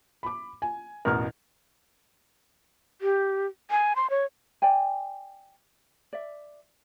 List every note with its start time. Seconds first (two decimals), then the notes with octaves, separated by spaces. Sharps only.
0.23 B5 D6
0.62 G#5
1.05 A1 E2 B2 A#4 F6
3.01 G4
3.71 G#5
3.96 C6
4.10 C#5
4.62 D5 G5 G#5
6.13 D5 E5